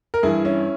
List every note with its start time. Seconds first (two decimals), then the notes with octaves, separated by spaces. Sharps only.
0.14 A#4
0.23 G2 E3 E4 G#4
0.45 C#4 E4